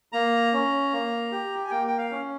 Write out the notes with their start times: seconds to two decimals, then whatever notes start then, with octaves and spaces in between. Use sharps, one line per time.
0.12 A#3 A#5
0.53 C#4
0.92 A#3
1.32 G4
1.65 G#5
1.71 A#3 G5
1.88 G5
1.98 F5
2.11 C#4